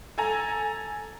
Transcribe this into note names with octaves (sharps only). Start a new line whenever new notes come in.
A4 G#5 A#5